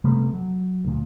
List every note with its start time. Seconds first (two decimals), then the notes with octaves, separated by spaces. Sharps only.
0.04 C3 G3 A3 B3
0.33 F#3
0.85 D2 A#2